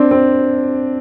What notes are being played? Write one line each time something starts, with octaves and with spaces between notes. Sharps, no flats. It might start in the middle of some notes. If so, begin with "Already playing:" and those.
Already playing: C4 D4
C4